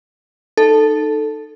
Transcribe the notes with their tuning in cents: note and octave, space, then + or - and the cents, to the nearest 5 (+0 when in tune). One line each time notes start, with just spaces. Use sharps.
D#4 -20 A4 +0